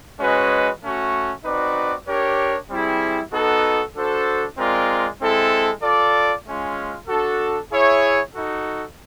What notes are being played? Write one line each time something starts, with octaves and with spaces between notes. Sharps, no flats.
G#3 C#4 F#4 B4 D#5
A3 C#4 F#4
C4 D#4 F#4 B4 D5
D4 G4 A#4 C#5
G3 C4 E4 G#4
B3 D#4 F#4 A4
D4 F#4 A4 C5
G#3 C4 F4 A#4 D5
G#3 C4 E4 A4
F4 A4 D5
G#3 C#4 F4
D4 F#4 A4
E4 G#4 C#5 E5
D#4 F#4 A4